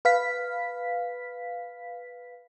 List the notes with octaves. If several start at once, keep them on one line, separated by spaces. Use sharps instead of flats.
B4 F5 B6